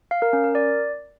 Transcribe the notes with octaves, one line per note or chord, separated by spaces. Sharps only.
F5
A#4
C#4
A#4
D5